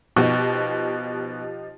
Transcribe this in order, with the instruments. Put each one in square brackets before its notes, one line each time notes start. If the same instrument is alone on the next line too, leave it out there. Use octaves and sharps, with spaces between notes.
[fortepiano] B2 [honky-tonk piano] F3 D#4 G4